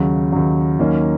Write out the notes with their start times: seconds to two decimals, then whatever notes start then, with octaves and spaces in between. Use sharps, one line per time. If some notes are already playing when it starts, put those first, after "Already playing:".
Already playing: D#2 C#3 F#3
0.32 D#2 C#3 F#3
0.79 D#2 D#3 F#3 A#3 C#4